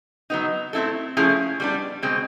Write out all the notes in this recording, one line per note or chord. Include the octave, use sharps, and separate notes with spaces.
F#3 B3 D#4
A3 C4 E4 A4
F3 A3 C#4 E4 G#4
G3 B3 D4
B2 G#3 C4